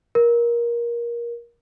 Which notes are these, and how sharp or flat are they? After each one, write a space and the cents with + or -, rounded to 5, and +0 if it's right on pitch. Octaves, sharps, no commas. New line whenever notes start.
A#4 +20